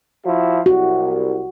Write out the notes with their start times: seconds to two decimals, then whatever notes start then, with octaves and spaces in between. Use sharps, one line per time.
0.25 F3 E4 F#4
0.66 C2 F#4